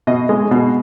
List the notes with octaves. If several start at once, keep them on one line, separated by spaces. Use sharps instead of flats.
B2 D#5
G#3
B2